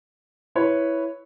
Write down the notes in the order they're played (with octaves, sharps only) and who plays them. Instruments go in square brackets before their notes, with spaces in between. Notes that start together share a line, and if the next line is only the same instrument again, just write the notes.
[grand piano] E4 B4 C#5